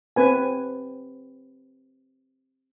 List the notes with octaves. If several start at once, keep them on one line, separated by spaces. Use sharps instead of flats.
C4 B4 G#5